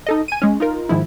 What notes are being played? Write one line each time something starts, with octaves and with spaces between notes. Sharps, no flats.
D#4 A4 D#5
G#5 D#7
G#3 C#4
D#4 F4 A#4
G#2 D#3 F3 E4